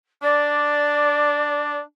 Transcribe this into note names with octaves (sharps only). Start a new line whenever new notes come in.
D4 D5